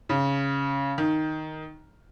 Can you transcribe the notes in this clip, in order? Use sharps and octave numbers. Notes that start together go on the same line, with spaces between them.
C#3
D#3